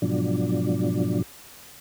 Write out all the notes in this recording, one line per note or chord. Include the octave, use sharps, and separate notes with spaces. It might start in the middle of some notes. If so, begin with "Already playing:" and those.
G#2 B2 F3 F#3 D4